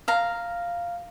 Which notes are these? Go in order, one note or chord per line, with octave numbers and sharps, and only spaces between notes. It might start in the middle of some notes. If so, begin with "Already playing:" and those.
F5 A#5